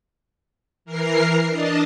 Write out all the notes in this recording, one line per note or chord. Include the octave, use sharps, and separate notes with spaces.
E3 A#4 F6 C7
D4 D#5 A5